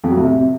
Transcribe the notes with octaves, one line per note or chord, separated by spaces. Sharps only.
F2
F#3
A2
C3